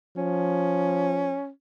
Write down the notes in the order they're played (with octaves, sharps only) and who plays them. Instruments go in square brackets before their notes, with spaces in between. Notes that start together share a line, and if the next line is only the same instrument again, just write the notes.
[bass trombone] F3 [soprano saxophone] C#4